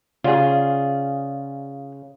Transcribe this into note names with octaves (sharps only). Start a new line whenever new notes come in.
C#3 F4 G#4 C#5 D5 F#5